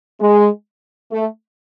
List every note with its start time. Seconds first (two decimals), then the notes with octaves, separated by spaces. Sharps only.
0.21 G#3
1.12 A3